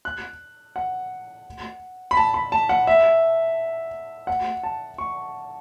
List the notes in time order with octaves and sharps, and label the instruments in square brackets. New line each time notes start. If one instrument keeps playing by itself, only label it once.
[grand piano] F#6
F#5
B5
A5
B5
A5
F#5
E5
F#5
A5
C#6